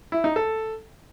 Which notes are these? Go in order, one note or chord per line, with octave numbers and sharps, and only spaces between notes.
E4
D#4
A4